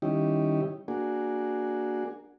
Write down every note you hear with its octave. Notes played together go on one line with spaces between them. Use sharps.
D#3 G3 C#4 D#4 E4 G4
A#3 D4 F#4 G#4